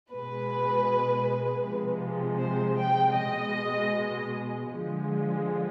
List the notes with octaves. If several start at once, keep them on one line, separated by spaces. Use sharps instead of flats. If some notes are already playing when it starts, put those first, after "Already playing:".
B2 G#3 B4
C3 F3 G#3
C5
G5
B2 G#3 D#5
D3 F3 G#3